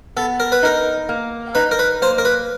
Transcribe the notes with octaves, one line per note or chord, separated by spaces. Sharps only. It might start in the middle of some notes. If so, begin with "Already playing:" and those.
B3 A4
A#4
B4
D#4 A#4
A#3
D#4 B4
A#4
B4
A#3 C5
A#4
B4